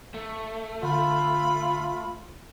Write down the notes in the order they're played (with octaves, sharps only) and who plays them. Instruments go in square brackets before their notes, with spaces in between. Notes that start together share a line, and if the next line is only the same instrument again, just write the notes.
[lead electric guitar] A3
[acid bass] D3 [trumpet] F4 [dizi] B5